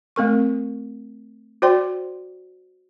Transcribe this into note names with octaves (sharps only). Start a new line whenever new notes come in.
A3 C4 A#4 C#6
F#4 C5 D5 G5 C6